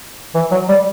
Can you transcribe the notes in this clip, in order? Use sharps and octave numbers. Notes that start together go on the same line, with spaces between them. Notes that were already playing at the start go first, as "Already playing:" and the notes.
E3
F#3
G3